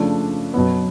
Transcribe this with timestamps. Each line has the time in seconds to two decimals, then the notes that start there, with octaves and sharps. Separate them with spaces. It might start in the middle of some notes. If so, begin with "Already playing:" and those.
Already playing: C#3 F3 A3 D4
0.54 B2 F#3 B3